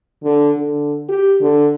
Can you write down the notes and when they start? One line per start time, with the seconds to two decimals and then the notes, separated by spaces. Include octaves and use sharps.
0.24 D3
0.57 D3
1.09 G4
1.41 D3